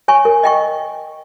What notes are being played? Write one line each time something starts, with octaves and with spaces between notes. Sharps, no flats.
C#5 G#5 C#6
A#4
D#5 G5 C#6